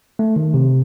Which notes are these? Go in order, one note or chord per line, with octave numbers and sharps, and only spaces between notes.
A3
D#3
C3